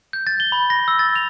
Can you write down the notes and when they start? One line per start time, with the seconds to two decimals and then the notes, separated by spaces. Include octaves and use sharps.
0.13 G6
0.27 A6
0.40 G7
0.52 B5
0.70 A#6
0.88 E6
0.99 A6
1.16 F7